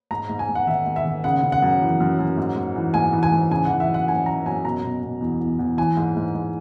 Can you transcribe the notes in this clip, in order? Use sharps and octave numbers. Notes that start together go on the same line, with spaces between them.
G#2 A#5
G#2
G#5
G#2
F#5
D#3 E5
G#2
E5
D#3
C#3 F#5
C#3
F#5
F#2
E3
F#2
F#2
G#2
G#2
E3
G#2 G#5
E3
G#5
G#2
C#3 G#5
E3 F#5
E5
F#2
F#5
F#2 G#5
F#2 A#5
F#2 G#5
B2 A#5
B2
B2
E2
E2
E2
E3 G#5
G#2
G#2
G#2